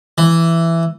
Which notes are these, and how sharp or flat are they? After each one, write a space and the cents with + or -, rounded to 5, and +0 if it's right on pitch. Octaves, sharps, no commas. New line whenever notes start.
E3 +10